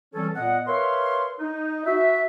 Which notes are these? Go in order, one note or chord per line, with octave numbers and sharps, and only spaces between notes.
E3 G3 C4 C#4 A4
A#2 B3 D#5 F#5
A#4 B4 C#5 E5 F5 C6
D#4
F#4 E5